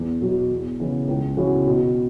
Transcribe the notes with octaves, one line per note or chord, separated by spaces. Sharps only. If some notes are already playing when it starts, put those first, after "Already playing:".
Already playing: E2
B2 F#3
E2
C#3 E3 B3
C#2
C#3 E3 C#4 F#4
B2